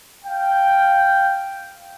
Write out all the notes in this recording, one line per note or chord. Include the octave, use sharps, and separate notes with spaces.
F5 G5